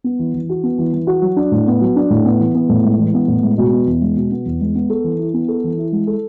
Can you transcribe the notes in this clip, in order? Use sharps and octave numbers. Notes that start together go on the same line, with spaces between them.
B3
E3
E3
F#4
B3
E3
E3
F#4
F#3
D4
A2
B3
F#3
D4
A2
B3
E3
B3
A2
G#3
E3
B3
A2
G#3
B2
B3
E2
G#3
B2
B3
E2
G#3
B3
A4
E3
E4
B3
A4
E3
E4
G#3
A4